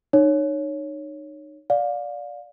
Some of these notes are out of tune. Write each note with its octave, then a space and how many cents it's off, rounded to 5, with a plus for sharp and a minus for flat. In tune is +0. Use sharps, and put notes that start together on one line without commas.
D#4 -30 C#5 +0
D5 -10 F5 +25